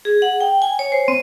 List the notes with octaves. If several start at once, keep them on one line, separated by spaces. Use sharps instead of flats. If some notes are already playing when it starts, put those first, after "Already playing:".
G#4
F#5
G5
G#5
C#5
C5
C4